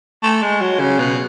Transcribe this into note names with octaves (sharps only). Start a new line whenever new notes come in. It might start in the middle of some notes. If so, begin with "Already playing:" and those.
A3
G#3
F#3
C#3
B2